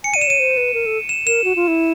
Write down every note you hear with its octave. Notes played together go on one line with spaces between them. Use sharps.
G#5 C#7
D5 D#7
E7
C#5 D#7
C5
B4
A#4
A4
E7
A#4 E7
F#4
F4
E4